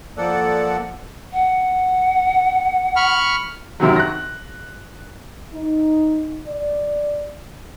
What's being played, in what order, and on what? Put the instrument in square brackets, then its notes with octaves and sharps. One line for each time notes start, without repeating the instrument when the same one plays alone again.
[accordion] F3 A#3 A4 D5 F#5
[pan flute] F#5
[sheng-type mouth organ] B5 C#6 F6
[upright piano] F#2 C3 D#3 F#3
F#6 A#6
[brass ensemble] D#4
D5